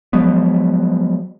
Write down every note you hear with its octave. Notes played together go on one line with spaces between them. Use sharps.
F3 F#3 G#3 B3